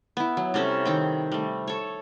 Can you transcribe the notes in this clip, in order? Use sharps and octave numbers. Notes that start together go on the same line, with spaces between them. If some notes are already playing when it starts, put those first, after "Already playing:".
B3 E4
F#3
C3 G3 C#4 A4
D#3 C4 G5
G3 A3
A4 C#5